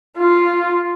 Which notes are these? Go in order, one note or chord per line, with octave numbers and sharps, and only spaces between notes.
F4